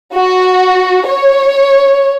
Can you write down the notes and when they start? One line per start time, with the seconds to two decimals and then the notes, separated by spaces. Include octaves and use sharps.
0.14 F#4
1.06 C#5